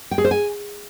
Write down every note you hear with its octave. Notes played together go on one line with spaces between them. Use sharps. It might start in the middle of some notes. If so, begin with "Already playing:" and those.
G5
G#4
C5
G#5